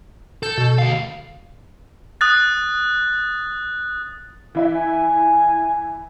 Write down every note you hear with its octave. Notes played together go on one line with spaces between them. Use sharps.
A4 G6
B2
D2 F5
D#6 F#6 A6
E3 E4 E5
G#5